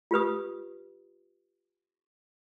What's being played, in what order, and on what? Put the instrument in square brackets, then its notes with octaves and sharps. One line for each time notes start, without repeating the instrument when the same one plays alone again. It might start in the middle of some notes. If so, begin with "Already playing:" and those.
[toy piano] F4 G4 B4 D#6